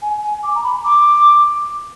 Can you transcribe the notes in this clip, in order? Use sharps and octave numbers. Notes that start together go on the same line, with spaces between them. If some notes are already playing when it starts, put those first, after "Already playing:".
G#5
G#5
D6
A#5
B5
D6